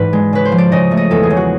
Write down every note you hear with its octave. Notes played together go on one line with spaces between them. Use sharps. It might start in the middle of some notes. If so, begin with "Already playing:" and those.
Already playing: G#2 E3 F#4 B4 D5
G#3
C#3 B4
C5
F3
D5
C#3 D#5
A3
D#5
E2 A4
G#4
C#3
F#4